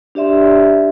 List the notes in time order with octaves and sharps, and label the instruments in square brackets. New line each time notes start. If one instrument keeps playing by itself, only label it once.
[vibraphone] D4 G4 D5 E5 C6